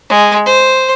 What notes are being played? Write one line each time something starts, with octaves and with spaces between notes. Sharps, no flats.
G#3
C5